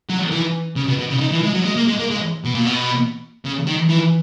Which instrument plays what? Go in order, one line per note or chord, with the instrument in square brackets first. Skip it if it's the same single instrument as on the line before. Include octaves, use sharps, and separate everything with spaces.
[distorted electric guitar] F#3
E3
C#3
B2
B2
C#3
D#3
E3
G#3
F#3
G#3
A#3
G#3
A#3
G#3
B2
A#2
B2
C#3
D#3
E3